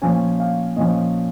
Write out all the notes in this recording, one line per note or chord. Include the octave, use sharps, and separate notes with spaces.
A#2 F3 C#4 G#5
F5
A#2 F3 C#4 D#5